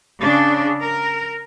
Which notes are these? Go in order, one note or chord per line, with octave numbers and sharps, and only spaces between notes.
C#3 D4
A#4